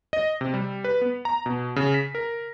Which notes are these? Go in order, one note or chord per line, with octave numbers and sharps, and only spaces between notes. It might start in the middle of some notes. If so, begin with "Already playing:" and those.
D#5
C3
G3
B4
B3
A#5
B2
C#3
B6
A#4